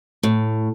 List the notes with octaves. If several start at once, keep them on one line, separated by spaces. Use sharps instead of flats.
A2